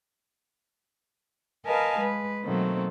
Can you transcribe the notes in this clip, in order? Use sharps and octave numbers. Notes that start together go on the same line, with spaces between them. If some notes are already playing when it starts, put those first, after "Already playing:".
A#4 B4 D#5 F5 G#5 A5
G#3 B4
B2 D#3 F#3 A3 A#3 C4